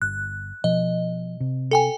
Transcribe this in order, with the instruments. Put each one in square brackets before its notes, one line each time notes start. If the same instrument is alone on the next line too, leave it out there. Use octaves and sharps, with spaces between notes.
[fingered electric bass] G1 [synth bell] F#6
[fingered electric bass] B2 F3 [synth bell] D#5
[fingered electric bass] C3
[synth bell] A4 G5 G#5